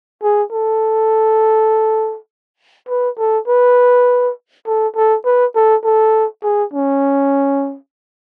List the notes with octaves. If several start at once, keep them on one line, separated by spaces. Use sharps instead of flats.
G#4
A4
B4
A4
B4
A4
A4
B4
A4
A4
G#4
C#4